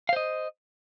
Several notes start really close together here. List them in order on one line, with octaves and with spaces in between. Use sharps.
F5 C5 D#5